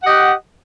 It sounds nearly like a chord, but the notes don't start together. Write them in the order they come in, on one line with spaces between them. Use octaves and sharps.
F#5 G4 D#5